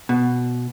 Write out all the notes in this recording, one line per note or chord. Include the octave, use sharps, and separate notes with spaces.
B2